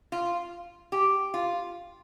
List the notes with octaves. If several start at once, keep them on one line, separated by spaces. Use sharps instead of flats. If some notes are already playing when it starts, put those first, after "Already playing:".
F4
G4
F4